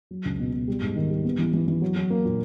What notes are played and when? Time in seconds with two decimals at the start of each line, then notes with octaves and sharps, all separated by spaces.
0.11 F#3
0.25 C#2
0.40 B2
0.53 B2
0.68 G3
0.82 G#2
0.96 D#3
1.10 G3
1.25 B3
1.39 E3
1.53 E3
1.68 E3
1.82 F#3
1.96 F#3
2.10 A#3
2.25 A#2